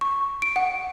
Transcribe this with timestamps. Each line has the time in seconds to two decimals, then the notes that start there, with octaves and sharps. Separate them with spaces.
0.01 C#6
0.42 D7
0.56 F#5